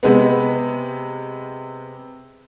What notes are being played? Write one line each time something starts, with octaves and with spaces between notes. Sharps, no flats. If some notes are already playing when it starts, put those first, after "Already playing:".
C3 G#3 B3